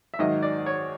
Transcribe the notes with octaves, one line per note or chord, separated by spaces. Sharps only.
E5
G#2 D#3 F#3 D#5
D5
C#5